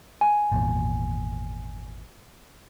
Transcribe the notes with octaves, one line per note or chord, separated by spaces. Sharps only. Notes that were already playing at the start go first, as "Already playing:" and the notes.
G#5
G#1 E2 A#2